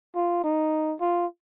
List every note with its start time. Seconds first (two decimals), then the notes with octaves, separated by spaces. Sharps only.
0.15 F4
0.44 D#4
1.01 F4